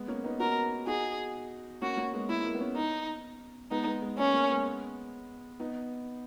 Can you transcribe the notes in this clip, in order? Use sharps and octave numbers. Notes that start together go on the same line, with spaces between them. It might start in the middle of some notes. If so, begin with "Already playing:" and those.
Already playing: G#3 B3
A#3 C#4
B3 D#4
D#4 F#4 A#4
D#4 F#4 G#4
A#3 C#4 F#4
A#3 C#4
G#3 B3
A#3 E4
A#3
B3
A#3 C#4
D#4
G#3 B3 D#4
G#3 B3
G#3
A#3 C#4
A#3
G#3 B3
B3 D#4